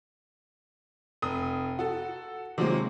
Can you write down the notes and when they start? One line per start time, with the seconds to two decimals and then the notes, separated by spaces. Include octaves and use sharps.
1.22 F1 D#6
1.79 F#4 A4
2.58 C3 D#3 F3 F#3 G#3 A#3